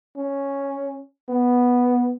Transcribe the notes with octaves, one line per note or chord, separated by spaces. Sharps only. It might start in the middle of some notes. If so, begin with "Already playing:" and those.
C#4
B3